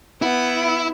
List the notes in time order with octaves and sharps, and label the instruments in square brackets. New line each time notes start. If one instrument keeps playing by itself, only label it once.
[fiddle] B3 F#5 [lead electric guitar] E4